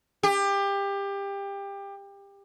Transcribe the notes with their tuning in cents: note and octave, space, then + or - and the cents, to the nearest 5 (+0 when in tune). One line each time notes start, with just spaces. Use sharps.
G4 +25